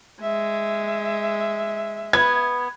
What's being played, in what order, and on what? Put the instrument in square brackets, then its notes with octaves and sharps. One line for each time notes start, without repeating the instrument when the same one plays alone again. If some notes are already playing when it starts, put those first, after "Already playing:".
[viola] G#3 [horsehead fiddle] E5
[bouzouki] B3 [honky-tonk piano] G#6